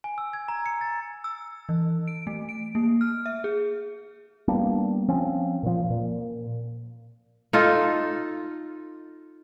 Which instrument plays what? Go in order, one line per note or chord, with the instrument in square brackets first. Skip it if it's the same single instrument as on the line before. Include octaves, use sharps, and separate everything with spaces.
[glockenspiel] G#5
E6
G#6
A#5
C#7
A6
[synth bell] E6
E3
D7
A3
D7
A#3
F6
E5
G#4
[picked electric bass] G3 A#3 B3 D4
F3 C4 C#4
A#2 F3
A#2
[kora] D#4 F4 A4